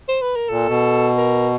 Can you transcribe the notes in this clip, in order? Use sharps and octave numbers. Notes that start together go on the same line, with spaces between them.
C5
B4
A#4
A#2 A4
B2
A#4